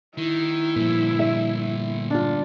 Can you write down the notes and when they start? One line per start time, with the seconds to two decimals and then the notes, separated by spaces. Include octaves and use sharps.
0.17 D#3 E4
0.76 G2 A#2 D3 F3
1.19 E5
2.10 D4 F4